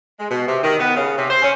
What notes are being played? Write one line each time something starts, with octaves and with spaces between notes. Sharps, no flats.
G#3
B2
C3
D#3
B3
C#3
C3
C5
C#4